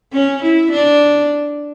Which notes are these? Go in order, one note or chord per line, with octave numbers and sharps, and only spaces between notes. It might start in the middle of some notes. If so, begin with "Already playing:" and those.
C#4
E4
D4